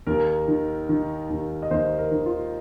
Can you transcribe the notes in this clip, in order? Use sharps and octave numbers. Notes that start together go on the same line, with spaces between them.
D#2 A#4
D#3
D#3
D#2
D#5
D#2 C5
A#4
D#3
F4